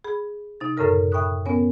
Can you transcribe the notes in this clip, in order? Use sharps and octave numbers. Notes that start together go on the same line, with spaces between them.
G#4 B5
C3 D#4 A6
F#2 A2 C#3 A4 A#4 F6
E5 G5 B5 C#6 D#6 F#6
B3 C#4 A#4 C#5 G#5